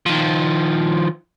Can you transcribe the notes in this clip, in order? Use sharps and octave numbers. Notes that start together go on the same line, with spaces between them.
D#3 F3